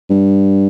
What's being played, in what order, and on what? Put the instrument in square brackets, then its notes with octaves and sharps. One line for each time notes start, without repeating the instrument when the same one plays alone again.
[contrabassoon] G2